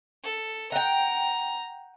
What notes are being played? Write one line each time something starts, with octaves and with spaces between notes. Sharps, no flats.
A4
F#5 G5 A#5